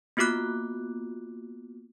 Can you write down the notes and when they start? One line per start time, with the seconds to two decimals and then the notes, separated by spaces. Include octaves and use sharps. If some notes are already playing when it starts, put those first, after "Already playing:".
0.17 A#3 B3 F4 F#4 D6 F#6